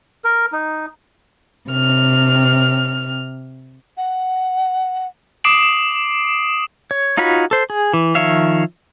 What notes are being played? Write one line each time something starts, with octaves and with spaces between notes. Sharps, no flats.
A#4
D#4
C3 F6
F#5
D6 D#6 C7 D7 E7 F#7
C#5
D#4 F4 F#4 C#5 B5
A4 C5
G#4
E3
D#3 F3 C#5 E5 F5